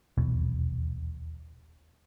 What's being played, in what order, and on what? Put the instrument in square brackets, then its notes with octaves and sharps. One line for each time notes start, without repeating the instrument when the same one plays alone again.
[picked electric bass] D#1 B1 E2 B2